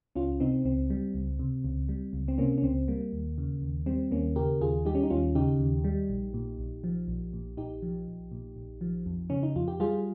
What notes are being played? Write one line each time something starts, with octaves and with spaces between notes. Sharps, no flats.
C#2 C#4 F4
C3 C4 D#4
C#2 C4
G3
C#2
C3
C#2
G3
C#2
C4
C3 A#3 C#4
C#4
C#2 C4
G3 A#3
D#2
C#3
D#2
G3 C4
D#2 A#3 C#4
C#3 G4 A#4
D#2 F4 G#4
G3 D#4 G4
C#4
D#4
D#2 C#4 F4
C#3 D#4 G4
D#2
G3
A#1
A#2
A#1
F3
A#1
A#2
A#1 D#4 G4
F3
A#1
A#2
A#1
F3
F2
C#3 C#4
D#4
F2 F4
G4
G3 F4 G#4